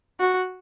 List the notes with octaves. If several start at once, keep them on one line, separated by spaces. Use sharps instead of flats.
F#4